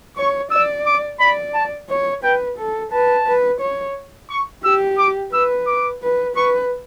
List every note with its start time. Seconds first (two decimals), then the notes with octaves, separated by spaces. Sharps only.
0.17 C#5 C#6
0.51 D5 E6
0.86 D6
1.20 D5 B5
1.54 A5
1.89 C#5
2.23 B4 G5
2.58 A4
2.92 B4 A5
3.27 B4
3.61 C#5
4.30 C#6
4.64 G4 E6
4.98 D6
5.33 B4 E6
5.67 D6
6.03 B4
6.36 B4 C#6